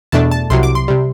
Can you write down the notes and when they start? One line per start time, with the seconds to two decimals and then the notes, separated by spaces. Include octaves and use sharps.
0.12 E2 B2 A3 D4 A5
0.32 A5
0.50 C2 C3 F#3 C6
0.63 D6
0.75 C6
0.88 C3 G3